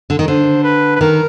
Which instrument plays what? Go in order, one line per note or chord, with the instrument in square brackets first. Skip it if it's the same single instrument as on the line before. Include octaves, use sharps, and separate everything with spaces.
[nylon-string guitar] D3
D#3
[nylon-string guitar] D3 [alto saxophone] C5
[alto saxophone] B4
B4
[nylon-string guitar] D#3 [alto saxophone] A#4